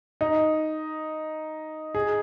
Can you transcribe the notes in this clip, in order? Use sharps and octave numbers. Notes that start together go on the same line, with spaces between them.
D#4
G#4